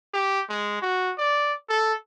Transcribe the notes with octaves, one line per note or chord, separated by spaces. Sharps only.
G4
G#3
F#4
D5
A4